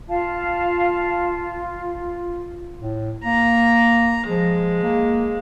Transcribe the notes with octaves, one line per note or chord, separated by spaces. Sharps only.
F4 F5 A5
A2
A#3 A#5
F3 G#3
A#3